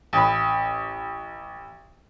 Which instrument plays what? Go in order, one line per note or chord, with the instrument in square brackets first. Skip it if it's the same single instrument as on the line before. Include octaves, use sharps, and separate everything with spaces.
[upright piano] A1 B5